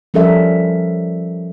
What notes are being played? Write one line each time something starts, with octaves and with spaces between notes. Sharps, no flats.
F3 G3 C#4 A4 A#4 E5